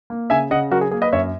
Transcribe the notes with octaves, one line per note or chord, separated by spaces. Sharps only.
A#3
C#3 E5 G#5
C#3 D#5 F#5
F#3 F#4 A#4
G#4
A#3 G#4
B4 D#5
F#2 C#5 E5